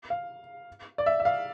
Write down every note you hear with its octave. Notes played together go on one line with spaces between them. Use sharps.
F5
D5
E5
E5
F5